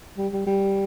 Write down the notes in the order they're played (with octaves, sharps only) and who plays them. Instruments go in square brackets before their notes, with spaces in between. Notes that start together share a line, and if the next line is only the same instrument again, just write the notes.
[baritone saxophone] G3
G3
G3